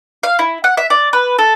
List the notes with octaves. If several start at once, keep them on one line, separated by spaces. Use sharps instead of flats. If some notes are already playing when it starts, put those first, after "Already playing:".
F5
E4
F#5
E5
D5
B4
A4